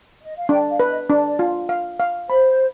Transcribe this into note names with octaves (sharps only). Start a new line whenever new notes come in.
D#5
F5
D4 G5
F5
B4
D#5
D4 D5
F4
F5
F5
C5 B5